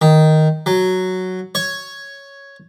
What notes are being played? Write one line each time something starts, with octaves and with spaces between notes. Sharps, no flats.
D#3
F#3
C#5